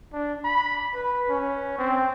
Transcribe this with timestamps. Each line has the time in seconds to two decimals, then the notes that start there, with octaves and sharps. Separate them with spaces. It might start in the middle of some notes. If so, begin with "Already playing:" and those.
0.13 D4
0.44 B5
0.94 B4
1.29 C#4
1.79 C4